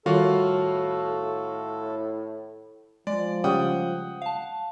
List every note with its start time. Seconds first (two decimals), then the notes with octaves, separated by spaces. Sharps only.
0.06 A2 D#3 G3 F4 F#4 A4 F5
3.07 F3 G#3 D5
3.44 C#3 G3 F#5 G5 D#6
4.22 F5 A5